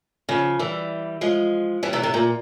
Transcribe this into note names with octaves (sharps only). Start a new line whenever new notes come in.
C#3 F3
E3 G3
F3 G#3
E3 G3
C3 E3
C3
A#2